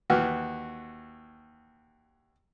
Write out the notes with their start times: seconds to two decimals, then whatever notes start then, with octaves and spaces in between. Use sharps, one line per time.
0.10 D#2 E3 F#4 F6